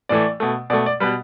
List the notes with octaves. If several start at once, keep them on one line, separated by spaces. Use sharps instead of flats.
A2 E3 A3 D5
B2 A3
B2 A3 D5
D5
B2 G3 B4